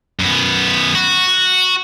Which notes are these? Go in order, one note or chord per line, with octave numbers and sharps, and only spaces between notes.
F#2 B3
F#4